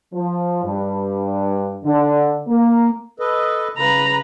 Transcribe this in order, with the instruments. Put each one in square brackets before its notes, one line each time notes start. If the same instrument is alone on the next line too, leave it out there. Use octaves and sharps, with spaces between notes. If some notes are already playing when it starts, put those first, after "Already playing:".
[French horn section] F3
G2
D3
A#3
[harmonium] A4 B4 D#5
[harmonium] C#3 [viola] B4 A#5